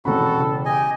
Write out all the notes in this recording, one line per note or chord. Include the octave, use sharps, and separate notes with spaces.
E1 C3 E3 C#4 F#4 A4 B5
C#3
G4 D#5 G#5